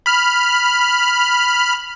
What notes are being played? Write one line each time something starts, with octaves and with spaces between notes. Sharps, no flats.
B5 F6